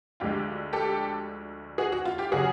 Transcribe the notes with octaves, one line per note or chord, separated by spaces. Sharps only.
D2 D3 F3 G#3 F4 G4
G4 A4
F#4 G#4
F#4
F4
F4 G4
C#3 F#3 F#4 G#4